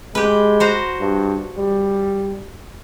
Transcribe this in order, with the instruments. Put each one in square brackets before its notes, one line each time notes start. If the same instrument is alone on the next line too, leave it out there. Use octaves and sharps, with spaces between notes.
[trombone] G#3 [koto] G4 B4
[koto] F#4 C5 A#5
[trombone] G2
G3